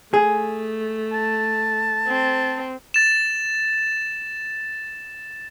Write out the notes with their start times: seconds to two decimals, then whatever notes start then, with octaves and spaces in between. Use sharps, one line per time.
0.14 A3 G#4
1.13 A5
2.08 C4
2.94 A6 E7